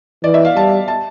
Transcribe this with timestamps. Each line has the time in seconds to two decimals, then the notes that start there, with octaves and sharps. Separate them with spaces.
0.23 E3 D5
0.34 E5
0.45 F5
0.56 G3 A5
0.88 A5